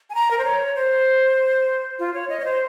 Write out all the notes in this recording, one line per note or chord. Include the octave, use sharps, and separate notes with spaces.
G#5
A#5
A#4
C5
C#5
C5
F4
C#5
D#5
C#5
C5